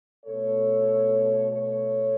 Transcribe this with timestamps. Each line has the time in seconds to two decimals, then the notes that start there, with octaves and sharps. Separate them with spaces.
0.25 B2 A3 A4 C#5
1.52 A4 C#5